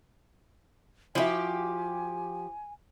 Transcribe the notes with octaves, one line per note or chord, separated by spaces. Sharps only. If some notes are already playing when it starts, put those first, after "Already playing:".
F3 E4 F#4 G4 E5 G#5